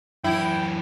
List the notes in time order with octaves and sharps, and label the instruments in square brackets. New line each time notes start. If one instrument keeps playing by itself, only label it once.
[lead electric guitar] F#2 E3 [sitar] E4 [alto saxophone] G5